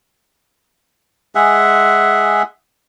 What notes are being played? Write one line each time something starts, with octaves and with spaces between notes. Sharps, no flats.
G#3 G#4 E5 F#5